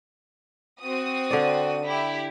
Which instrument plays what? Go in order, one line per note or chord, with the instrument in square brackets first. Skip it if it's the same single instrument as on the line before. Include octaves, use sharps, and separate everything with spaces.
[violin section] C4 F#4 D#6
[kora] D3 D5
[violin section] E4 G4